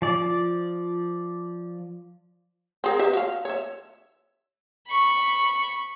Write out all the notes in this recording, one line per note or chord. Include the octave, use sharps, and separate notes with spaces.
F3 D5
C4 G#4 A#4
G4 B4 E5
F#4 F5
C#5 E5
B5 C#6